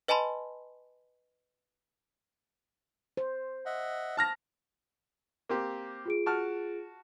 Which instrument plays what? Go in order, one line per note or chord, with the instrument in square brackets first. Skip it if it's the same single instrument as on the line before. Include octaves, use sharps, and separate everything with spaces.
[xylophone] B4 D#5 G#5 A5 B5 C6
[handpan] C5
[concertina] D#5 E5 F#5
[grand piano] A5 F6 A#6
[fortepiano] A#3 C4 G4
[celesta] F4 G#4 D7
[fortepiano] F#4 A5 F6